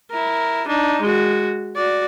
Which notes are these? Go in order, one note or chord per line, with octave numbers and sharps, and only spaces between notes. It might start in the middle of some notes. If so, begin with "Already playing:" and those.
E4 A#4
D4 D#4
G#3 F#4
F#4 D5